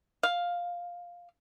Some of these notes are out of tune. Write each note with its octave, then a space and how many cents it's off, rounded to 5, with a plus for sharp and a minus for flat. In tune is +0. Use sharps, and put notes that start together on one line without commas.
F5 +5